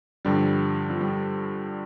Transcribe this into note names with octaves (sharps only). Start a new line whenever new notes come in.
G2 D3 F3 G3
F3
G3